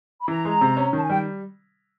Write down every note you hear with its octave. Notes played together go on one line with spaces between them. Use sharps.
B5
E3 A#5
G#3
C3
C#4
D#3 A5
G#5
G3 G5